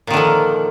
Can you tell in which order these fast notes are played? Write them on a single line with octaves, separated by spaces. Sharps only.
A#2 D#3 D3 F3